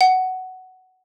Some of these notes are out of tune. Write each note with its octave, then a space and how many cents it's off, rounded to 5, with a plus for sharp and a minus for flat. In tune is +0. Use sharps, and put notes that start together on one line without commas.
F#5 +10